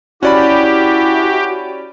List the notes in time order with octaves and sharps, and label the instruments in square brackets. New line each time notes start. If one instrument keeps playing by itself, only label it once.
[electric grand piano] C#4 D5 B5 [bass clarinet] E4 [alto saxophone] F#4 [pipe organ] G4